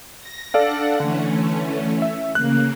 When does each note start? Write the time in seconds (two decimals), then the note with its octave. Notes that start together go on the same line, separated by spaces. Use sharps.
0.20 A#6
0.54 D4 A4 D5 F5 F#5
1.00 D3 E3 A3 C#4
2.02 E5
2.35 C#3 A#3 F#6